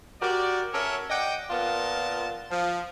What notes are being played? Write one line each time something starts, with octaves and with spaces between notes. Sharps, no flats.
F#4 G4 A#4 D5
C#4 A4 A#4 C#5 E5
D5 D#5 F#5 G5
A#2 B3 F4 A#4 A5
F3